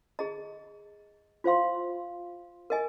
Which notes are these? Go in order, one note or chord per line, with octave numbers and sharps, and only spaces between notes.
G#4 D#5 A#5
F4 C5 F5 C6
A#4 D#5 G#5